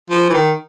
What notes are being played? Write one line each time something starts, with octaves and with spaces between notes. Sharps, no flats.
F3
E3
D#3